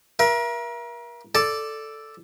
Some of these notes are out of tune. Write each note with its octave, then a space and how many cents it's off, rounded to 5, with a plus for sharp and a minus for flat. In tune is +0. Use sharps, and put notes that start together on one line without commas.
A#4 +35 E5 +30
A4 +0 D5 +0 A5 +0